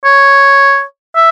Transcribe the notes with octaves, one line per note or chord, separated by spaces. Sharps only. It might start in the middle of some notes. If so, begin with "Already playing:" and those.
C#5
E5